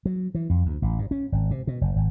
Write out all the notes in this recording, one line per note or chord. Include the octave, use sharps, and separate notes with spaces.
F#3
E3
F2
D2
A1
G2
C#4
G#1
C3
B2
F#1
G#1